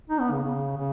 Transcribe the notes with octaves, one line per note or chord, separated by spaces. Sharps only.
D#4
B3
C#3
C#3
C#3